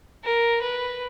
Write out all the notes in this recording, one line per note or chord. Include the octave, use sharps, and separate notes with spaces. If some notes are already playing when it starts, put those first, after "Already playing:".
A#4
B4